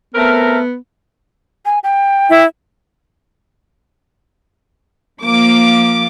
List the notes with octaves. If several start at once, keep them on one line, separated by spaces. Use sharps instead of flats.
A3 B3 C4 A#4
G#5
G5
E4 E5
F3 A#3 D6